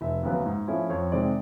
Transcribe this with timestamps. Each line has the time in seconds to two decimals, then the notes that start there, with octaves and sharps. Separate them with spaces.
0.01 F1 E5
0.23 D#2 C#3 F#3 B3
0.46 G#2
0.68 F3 A3 C#4 E4
0.90 F2 C#5
1.11 C3 D#3 G#3 C4 D5